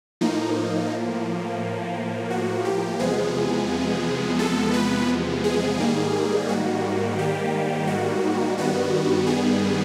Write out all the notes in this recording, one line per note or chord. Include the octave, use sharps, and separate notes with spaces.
A2 F3 A#3 D#4
F#4
G4
E2 C3 F3 G#3 B3 G#4
A4
B4
G#4
G#2 D#3 G3 A#3
F#4
G4
F#4
G2 D#3 G3 B3 F#4
G#4